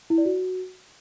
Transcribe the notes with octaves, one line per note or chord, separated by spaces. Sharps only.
E4
D5
F#4